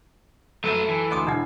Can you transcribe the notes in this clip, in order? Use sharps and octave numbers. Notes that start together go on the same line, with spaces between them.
F#2 A3 A4 B4 E6 E7
E3
D2 D#5 C6 D6 D#6
E1 D4 E4 F#5 G#6